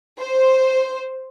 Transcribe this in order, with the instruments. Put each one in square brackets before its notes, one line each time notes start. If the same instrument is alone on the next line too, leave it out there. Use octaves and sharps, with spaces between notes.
[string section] C5